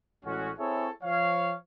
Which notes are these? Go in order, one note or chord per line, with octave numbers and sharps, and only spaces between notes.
A1 G#3 C#4 F#4
C4 E4 G#4 A4 C#5
F3 C#5 F5